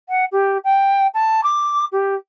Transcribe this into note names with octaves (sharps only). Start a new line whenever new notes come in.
F#5
G4
G5
A5
D6
G4